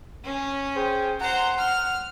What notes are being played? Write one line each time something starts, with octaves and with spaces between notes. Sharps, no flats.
C#4
G#4 C5 G5
C5 F#5 A#5
F6